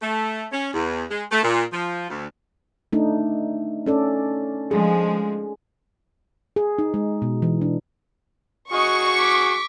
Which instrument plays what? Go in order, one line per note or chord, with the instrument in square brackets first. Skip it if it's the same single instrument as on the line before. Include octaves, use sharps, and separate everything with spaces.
[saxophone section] A3
C#4
E2
G#3
A3
A#2
F3
D2
[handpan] A3 D4 D#4
C#4 A4 D5
[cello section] F3 G#3 [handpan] G#4
[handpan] G#4
D#4
G#3
B2
E3
D4
[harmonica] F#4 G#4 [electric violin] D#5 [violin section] C#6
[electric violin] D6 B6